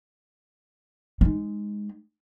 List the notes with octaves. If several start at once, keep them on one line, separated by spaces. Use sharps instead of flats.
G#3 D#4